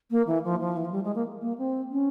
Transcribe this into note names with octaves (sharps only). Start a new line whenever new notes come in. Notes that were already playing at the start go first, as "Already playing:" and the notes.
A#3
E3
F3
F3
E3
F3
G3
G#3
A#3
A#3
C4
C#4